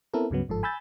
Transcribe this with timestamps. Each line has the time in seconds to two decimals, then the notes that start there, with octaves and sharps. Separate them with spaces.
0.14 B3 C4 E4 A4 A#4
0.30 C#2 G2 C#3 F#3 B3
0.48 G1 G#2 F3 A4
0.63 G#5 B5 E6 G6 A6